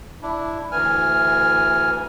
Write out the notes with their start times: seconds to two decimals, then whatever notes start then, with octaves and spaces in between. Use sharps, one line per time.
0.23 D4 E4
0.72 D2 E3 G#5 F6